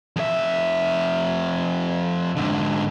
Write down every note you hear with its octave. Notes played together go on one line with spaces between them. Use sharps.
F2 E5
G#2 D3